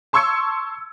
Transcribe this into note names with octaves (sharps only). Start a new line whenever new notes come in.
A5 C6 C#6 E6 G#6 C#7